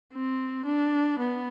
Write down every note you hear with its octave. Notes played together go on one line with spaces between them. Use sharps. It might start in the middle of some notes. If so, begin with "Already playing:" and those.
C4
D4
B3